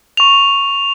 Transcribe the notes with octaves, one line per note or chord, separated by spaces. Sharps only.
C#6 F7